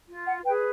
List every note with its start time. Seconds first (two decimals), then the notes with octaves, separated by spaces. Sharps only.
0.08 F4
0.26 F#5
0.44 G#4 B4 G5